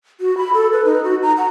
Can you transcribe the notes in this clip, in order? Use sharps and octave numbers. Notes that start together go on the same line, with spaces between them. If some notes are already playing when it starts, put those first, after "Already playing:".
F#4
B5
A4
B4
D#4
F#4
A#5
F#5